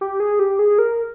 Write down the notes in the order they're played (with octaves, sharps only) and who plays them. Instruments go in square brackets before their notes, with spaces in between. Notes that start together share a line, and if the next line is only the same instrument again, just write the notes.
[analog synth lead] G4
G#4
G4
G#4
A#4